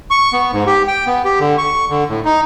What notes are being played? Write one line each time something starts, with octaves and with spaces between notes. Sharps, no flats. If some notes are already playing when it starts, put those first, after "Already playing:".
C#6
B3
G#2
G4
G5
B3
G4
D3
C#6
D3
A2
D#4